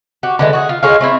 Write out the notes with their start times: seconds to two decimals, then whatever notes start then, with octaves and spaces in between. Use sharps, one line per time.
0.23 F#4 G4
0.39 D3 E3 G#3
0.53 F#4 G#4
0.69 F4
0.83 G#3 G#4 C#5 F5
1.01 A3 C4 E4